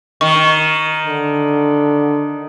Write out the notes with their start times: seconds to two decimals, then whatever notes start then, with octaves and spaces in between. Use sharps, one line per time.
0.21 D#3 C#6
1.07 D3